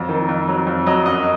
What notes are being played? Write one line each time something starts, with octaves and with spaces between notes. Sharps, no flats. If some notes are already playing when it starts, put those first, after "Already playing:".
Already playing: F2 F3 F#3
D#3
F2
F#3
F2
F#3 D#5
F#2 D#5